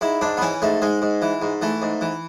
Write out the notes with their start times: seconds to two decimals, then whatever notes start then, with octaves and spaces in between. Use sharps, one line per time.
0.01 G#2 E4
0.21 G#2 D4
0.37 B3
0.42 E3 C#4
0.62 G#2 A3
0.82 G#2 G#3
1.02 G#2
1.22 E3
1.42 G#2
1.62 E3 A3
1.82 G#2
2.01 E3